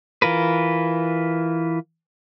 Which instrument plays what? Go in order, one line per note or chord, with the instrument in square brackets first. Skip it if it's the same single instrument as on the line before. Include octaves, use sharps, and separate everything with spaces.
[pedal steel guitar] E3 F4 A#4 B4